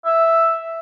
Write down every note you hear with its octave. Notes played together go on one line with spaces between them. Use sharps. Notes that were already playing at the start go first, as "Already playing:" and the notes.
E5